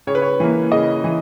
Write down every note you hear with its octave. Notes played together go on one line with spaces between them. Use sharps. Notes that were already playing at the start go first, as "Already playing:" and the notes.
C#3 C#5
B4
C#5
E3 A#3
C#3 D#5
E3